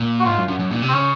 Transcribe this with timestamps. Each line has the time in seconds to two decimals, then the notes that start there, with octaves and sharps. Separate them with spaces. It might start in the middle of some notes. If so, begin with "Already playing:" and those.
Already playing: A#2
0.20 F#4
0.25 G#2 F4
0.38 F#2
0.48 F#2
0.59 F#2
0.71 A#2
0.82 C3
0.89 C4
0.93 C#3 C#4